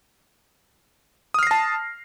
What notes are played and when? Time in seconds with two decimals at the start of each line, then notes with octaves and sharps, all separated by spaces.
1.34 D#6
1.39 F6
1.43 C7
1.47 A#6
1.51 A5